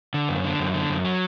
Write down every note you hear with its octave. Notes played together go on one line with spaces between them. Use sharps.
D3
F#2
D3
F#2
D3
F#2
F#3